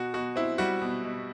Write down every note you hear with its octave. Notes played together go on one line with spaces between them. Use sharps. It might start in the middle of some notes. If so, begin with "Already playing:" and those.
Already playing: B2 F#4
B2 F#4
C4 E4
G3 F#4
B2
B2